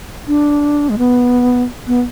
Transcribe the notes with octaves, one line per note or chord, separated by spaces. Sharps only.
D4
G#3
B3
B3